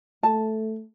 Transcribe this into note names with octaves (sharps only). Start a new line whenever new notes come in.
A3 A5